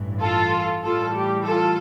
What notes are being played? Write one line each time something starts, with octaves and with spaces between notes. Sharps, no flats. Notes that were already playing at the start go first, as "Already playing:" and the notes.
Already playing: A1 G2 E3
F4 A4
A2 E3 G3 F4 A4
G4
F4 A4